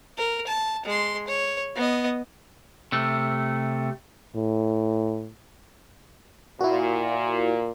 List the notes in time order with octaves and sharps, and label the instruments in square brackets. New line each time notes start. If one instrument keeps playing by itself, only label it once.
[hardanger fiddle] A#4
A5
G#3 C6
C#5
B3 D#5
[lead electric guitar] C3 A3
[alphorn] A2
[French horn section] A#2 [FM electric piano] E4 F#4